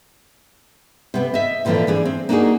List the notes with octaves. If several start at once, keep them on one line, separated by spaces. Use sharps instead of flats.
C3 B3 C4
D#5 E5
A#2 D3 E3 F3 C4 E4
E3 D4 G#4
C4
A#3 D4 D#4 F4 F#4 G#4